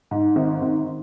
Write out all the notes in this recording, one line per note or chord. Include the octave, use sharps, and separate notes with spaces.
G#2
G#1
G#1